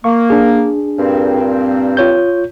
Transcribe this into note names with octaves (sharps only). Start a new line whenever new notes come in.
A#3 C#6
D4 G#4
G2 A#2 C4
F4 C#5 G6